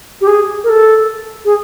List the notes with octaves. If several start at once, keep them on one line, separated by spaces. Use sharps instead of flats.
G4
G#4
A#4
A4
G#4